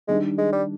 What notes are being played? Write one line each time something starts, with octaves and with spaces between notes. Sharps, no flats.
D#3 G3 G#3 D4
G#3
G3